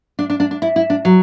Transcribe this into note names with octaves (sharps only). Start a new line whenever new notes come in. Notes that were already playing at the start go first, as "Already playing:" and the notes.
D4
D4
D4
D4
E4
E4
D4
F#3